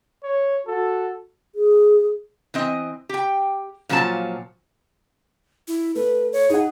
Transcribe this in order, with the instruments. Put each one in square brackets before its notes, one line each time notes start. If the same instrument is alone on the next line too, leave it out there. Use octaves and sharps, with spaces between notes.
[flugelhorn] C#5
[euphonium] F#4 [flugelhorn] A4
[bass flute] G#4
[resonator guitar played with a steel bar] E3 C4 D#5
G4 G5
A#2 F3 F#3 C#4 E4 A5
[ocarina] E4
[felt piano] A3 [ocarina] B4
[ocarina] C#5
[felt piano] D#4 F#5 [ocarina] G#4